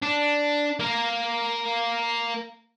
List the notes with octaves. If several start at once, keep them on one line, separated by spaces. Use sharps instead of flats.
D4
A#3 A#4